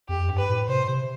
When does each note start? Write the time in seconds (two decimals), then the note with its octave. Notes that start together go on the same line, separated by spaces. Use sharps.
0.09 F2 G4
0.29 G2
0.38 B4
0.49 A2
0.69 C3 C5
0.88 C3